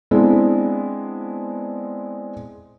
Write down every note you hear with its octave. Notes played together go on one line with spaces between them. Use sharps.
G#3 B3 C4 D4 E4